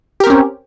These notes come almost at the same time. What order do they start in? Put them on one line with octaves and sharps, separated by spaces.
G4 A#4 C4 C#4